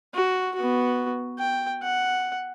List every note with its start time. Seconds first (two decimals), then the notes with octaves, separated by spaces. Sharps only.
0.14 F#4
0.55 B3 F#4
1.38 G5
1.83 F#5